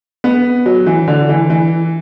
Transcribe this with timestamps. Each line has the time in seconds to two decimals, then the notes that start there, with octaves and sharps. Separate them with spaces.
0.24 B3
0.66 F#3
0.86 E3
1.08 D3
1.29 E3
1.50 E3